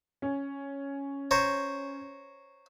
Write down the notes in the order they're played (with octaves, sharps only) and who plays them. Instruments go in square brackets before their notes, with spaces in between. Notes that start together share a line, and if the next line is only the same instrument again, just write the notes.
[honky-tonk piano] C#4
[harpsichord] C5 C#5 A#5